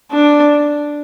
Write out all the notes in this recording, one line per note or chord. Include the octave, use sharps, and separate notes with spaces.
D4